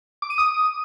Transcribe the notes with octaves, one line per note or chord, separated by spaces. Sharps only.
D6
D#7
D#6